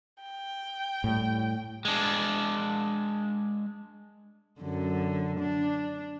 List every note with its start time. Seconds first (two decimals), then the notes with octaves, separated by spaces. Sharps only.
0.22 G5
1.04 A2 G3
1.85 G#3 D4
4.61 F#2 D3
5.40 D4